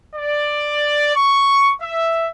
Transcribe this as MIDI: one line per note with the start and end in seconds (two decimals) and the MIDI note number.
0.16 1.13 74
1.15 1.72 85
1.81 2.28 76